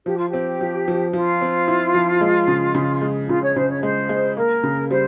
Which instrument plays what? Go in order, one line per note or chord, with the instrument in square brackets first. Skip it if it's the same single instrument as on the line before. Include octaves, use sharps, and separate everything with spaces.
[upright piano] F3 [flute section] G4
[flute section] F4
[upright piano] C4 [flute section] G4
[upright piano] F3
F3
[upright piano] F3 [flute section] F4
[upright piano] C4
E4
F3
G#3
C#3
C#3
G#3
[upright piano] C#3 [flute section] F4
[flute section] C#5
[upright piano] C#3 [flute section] C5
[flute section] C#5
[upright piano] G#3 [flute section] C5
[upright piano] G#3
[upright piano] A#3 [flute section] A#4
[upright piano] C#3
[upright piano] G3 [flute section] C5